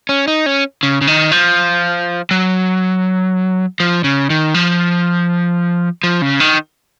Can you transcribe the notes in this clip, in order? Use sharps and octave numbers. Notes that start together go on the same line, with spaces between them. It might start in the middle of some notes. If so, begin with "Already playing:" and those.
C#4
D#4
C#4
C#3
C#3
D#3
F3
F#3
F3
C#3
D#3
F3
F3
C#3
D#3